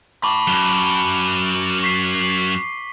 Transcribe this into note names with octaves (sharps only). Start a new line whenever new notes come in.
A5 B5 C#6 D6 F#7
F#2 G7
C#6 B6 C7